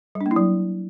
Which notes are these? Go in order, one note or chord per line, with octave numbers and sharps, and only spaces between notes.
G3
D4
A#3
E4
F#3